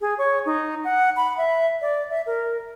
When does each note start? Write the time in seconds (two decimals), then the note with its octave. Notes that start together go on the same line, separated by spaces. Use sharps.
0.01 G#4
0.18 C#5
0.46 D#4
0.84 F#5
1.17 B5
1.37 E5
1.81 D5
2.10 E5
2.26 A#4